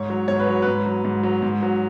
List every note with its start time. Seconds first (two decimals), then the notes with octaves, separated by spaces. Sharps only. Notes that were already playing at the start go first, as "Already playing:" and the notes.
Already playing: G#2 C#5
0.10 F#3
0.28 G#2 C#5
0.39 B4
0.47 F#3
0.62 G#2 B4
0.86 F#3
1.04 G#2
1.23 F#3
1.42 G#2
1.63 F#3